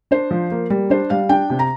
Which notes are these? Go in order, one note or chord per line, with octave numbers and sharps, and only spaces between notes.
D4 C5
F3
A#3
G3
D4 C5
G3 F5
D4 G5
C3
A#5